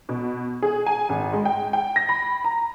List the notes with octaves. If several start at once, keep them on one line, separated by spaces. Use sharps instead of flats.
B2
G#4
G#5
G#1
G#3
G5
G5
A#6
B5
A#5